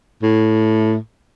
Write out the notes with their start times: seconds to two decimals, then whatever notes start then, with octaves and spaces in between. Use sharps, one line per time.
0.23 A2